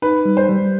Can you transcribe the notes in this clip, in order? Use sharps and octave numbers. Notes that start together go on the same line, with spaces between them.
D#4 B4
G3
C5
G3